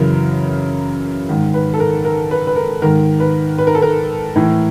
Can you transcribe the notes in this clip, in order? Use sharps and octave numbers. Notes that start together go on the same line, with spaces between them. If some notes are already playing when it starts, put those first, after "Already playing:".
Already playing: F#2 C#3 E3 A#4
G#2 D#3
B4
A4
A#4
A#4
B4
B4
A#4
G#2 D#3 A#4
B4
B4
A#4
A4
A#4
A2 E3